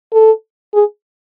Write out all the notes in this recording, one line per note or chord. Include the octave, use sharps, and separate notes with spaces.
A4
G#4